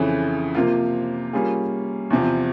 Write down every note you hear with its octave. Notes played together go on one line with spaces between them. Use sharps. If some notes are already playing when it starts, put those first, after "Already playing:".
Already playing: F2 C#3 E3
C3 F3 A#3 F4
G3 A#3 C#4 F4 G#4
E2 C3 F3